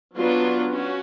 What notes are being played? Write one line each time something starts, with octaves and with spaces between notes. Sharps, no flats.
F#3 B3 D4 F4
C#4 F#4